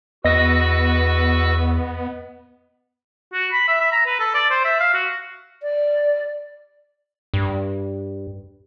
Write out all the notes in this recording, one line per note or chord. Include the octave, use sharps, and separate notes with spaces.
E2 B3 F#4 B4 D#5 E6 A#6
F#4
B5
E5
E5
A#5
B4
A4
D5
C5
E5
F5
F#4
D5
G2